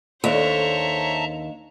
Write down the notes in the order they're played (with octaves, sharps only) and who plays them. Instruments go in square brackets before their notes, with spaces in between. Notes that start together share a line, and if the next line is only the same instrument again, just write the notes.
[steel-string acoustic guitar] D#2 [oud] D4 A4 [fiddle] C5 C#5 [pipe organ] E5 A5 A#5